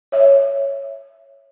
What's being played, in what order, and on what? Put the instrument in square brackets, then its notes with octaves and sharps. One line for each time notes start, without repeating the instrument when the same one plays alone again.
[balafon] C#5 E5